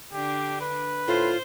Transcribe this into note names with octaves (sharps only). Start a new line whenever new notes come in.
D3 D4 G4
B4
A2 F4 C5